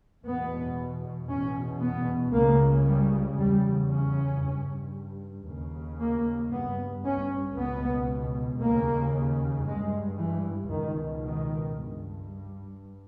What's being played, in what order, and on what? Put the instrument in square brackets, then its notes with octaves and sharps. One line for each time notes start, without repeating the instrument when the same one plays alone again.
[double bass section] E2 B2 B3
E2 B2 C#4
B3
C#2 C#3 A#3
G3
E2 C#3 G3
C#4
G2
D#2 C#3
A#3
G2 B3
C#4
C#2 B2 B3
D#2 C#3 A#3
G2 G#3
E3
C#2 B2 D#3
D#3
G2